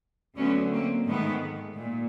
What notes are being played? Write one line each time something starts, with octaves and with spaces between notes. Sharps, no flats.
D2 D3 F#3 A3 B3 C#4
A#3 C4
G#2 D#3 G#3 A3 B3
A#2